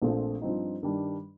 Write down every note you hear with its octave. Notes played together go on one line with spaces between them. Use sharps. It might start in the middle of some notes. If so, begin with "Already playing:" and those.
A#1 A#2 F3 A3 C4
G2 F3 C4 D#4
G2 D#3 G3 D4